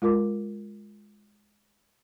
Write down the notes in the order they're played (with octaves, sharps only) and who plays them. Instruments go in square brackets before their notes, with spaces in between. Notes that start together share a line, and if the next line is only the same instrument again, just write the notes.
[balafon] G#3 F4 A#4 D6